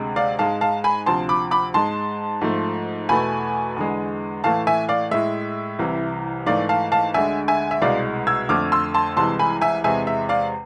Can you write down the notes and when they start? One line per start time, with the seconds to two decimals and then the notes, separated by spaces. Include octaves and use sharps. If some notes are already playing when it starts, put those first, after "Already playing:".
Already playing: D2 C3 G#3
0.16 D5 F5
0.39 G#2 G#3 F5 A5
0.61 F5 A5
0.84 G#5 B5
1.06 D2 C3 F3 A5 C6
1.29 B5 D6
1.51 B5 D6
1.74 G#2 G#3 A5 C6
2.41 G#2 F3 A3
3.09 E2 B2 A3 G#5 B5
3.76 E2 D3 G#3
4.44 A2 E3 A3 F5 A5
4.67 E5 G#5
4.89 D5 F5
5.11 A2 G#3 E5
5.79 C2 C3 E3
6.46 G#2 E3 A3 D5 F5
6.69 F5 A5
6.92 F5 A5
7.14 D2 D3 G#3 E5 G#5
7.48 E5 G#5
7.71 E5
7.82 C2 B2 G#3 D5 F5
8.27 E6 G#6
8.49 F2 D3 A3 D6 F6
8.72 C6 E6
8.94 A5 C6
9.17 C2 C3 E3 G#3 A5 C6
9.39 G#5 B5
9.61 E5 G#5
9.84 E2 C3 G#3 E5 G#5
10.07 E5
10.29 D5 F5